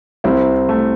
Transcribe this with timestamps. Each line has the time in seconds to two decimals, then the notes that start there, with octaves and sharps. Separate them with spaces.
0.24 C2 C4 E4
0.69 A3